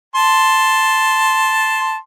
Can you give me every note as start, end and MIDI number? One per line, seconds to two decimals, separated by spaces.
0.16 1.97 81
0.16 1.97 84